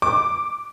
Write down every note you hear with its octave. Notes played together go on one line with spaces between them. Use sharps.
D6